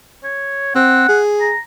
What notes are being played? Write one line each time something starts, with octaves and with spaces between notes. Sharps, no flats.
C#5
C4 F#5
G#4
A#5